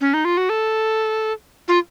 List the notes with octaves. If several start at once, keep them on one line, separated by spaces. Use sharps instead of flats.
C#4
D#4
F4
F#4
A4
F4